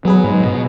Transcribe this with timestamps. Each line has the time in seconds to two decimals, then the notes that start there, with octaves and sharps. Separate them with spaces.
0.05 F#3 B3 G#4 B4
0.24 G#2
0.44 B2